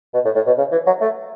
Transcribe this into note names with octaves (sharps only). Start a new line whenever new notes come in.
B2
A2
A2
B2
C#3
E3
F#3
A3